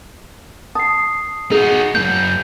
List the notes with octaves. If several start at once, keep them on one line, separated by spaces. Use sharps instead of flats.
A5 D#6 C7
D#4 F#4 G#4
F#2 A#3 G6